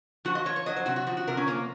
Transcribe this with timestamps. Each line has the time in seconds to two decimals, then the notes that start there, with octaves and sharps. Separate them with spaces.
0.25 F3 F#4
0.35 D#5
0.46 F3 C#5
0.56 C#5
0.66 F#3 D#5
0.76 C5
0.86 C3 F#4
0.96 F#4
1.07 F3 F#4
1.17 F#4
1.27 C3 A#4
1.37 C#4
1.47 C3 A#3